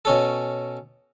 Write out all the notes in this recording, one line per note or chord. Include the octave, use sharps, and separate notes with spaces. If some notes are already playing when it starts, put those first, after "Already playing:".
B2 C#4 A4